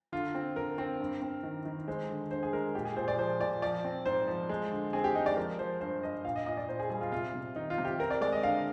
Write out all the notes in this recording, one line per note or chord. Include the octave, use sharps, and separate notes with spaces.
D3 F4
C4
D3 A#4
C4
G2
C4
D#3
D#3
G#3 C5
D3
D3 C5
G#4
G#3 A#4
A#2 G4
G#4
A#2 C5
D5
F3 C5
A#2 D5
F3 D5
C4
G#2 C5
F3
G#3
D3
C4 G#4
G4
G#3 D#4
D5
F3 A#4
F3 C5
G2 C5
G2 D#5
A#2 F5
D#5
A#2 D#5
D5
A#2 C5
G#4
G3 G#4
F4
C3 F4
C3
D#3 D#4
F4
C3
G4
C4 A#4
D5
G#3 D5
D#5
D3 F5